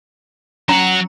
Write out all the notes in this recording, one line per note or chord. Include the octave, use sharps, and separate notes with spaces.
F#3 C#4 F#5 A#5